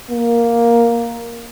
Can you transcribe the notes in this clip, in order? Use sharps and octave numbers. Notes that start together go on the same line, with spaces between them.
A#3